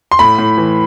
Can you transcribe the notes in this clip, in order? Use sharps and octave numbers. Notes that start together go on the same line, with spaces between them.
C6
A2 B5
A2
E3